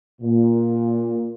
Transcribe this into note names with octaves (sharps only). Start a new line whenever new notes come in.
A#2